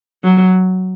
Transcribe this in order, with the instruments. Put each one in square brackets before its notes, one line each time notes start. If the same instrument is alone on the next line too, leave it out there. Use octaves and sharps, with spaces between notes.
[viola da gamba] F#3